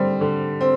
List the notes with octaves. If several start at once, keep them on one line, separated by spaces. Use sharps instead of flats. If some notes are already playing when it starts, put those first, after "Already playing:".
Already playing: D3 G3 C4
D3
C4